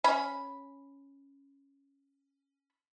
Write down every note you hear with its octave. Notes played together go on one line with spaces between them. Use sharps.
C#4 B5